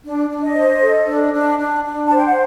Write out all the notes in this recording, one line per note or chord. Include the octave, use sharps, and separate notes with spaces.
D4
D4
D#5
C5
A4
D4
D4
D4
D4
C5 A5
G5
F#5